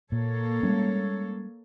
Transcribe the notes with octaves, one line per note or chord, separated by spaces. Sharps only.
A#2 A#3 A4 C#5
G3 G#3 C#4